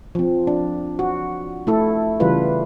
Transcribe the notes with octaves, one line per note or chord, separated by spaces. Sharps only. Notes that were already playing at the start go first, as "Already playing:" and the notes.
F3 C4
D4
F#4
A3 E4 A4
C#3 E3 G3 F4 B4